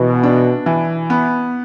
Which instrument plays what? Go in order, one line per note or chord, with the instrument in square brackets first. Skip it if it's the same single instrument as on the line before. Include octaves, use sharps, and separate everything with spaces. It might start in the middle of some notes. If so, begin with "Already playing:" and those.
Already playing: [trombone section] B2 [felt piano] E3
[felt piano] D4
E3
B3